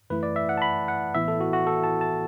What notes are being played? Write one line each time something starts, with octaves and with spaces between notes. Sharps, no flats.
F#2 E3 A3 E4 B4
D5
E5
F#5
A5
B5
F#5
A1 A2 E3 B3 E4 E5
A4
F#4
F#4
A4
A5
A5